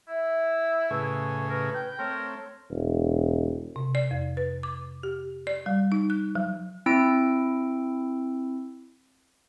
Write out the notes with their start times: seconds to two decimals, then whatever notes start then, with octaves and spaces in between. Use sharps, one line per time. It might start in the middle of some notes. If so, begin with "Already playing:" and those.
0.08 E4 E5
0.90 A2 C#3 G#4 B4
1.49 A#4 B4
1.74 G5
1.99 A3 C4 A#4 C#5
2.71 E1
3.76 C3
3.95 D5
4.11 F2
4.37 B4
4.63 D6
5.03 G4
5.47 D5
5.66 G3
5.92 D#4
6.10 F#6
6.35 F#3
6.86 C4 E4 E6 D7